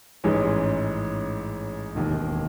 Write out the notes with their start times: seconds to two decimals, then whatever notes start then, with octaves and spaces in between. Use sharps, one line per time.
0.24 A1 G#2 E3 G#3 C#4
1.95 E1 D#2 D#3